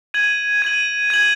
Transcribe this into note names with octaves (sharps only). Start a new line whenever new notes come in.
G#6 D#7 F#7
G#6 D#7 F#7
G#6 D#7 F#7